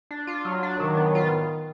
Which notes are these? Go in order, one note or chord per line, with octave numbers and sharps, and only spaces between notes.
D4
F4
F#3
D4
D#3 F#3
B3
F4